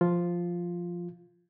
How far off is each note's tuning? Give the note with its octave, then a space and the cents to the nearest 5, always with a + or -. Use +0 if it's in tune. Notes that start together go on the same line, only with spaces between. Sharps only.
F3 +0 F4 +0